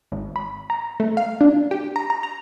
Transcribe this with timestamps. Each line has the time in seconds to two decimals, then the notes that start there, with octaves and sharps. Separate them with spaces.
0.12 G#1
0.36 B5
0.70 A#5
1.00 A3
1.17 F5
1.41 D4
1.71 G4
1.96 A#5
2.10 A#5
2.23 A#5